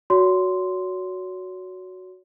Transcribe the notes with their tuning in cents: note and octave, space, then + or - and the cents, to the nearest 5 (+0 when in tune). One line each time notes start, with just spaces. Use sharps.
F#4 +0 C#5 +35 C6 -10